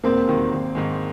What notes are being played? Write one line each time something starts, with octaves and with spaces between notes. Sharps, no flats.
E1 A#3 C4
D#2 D#3 F#3
G#1
G#2 D#3 G#3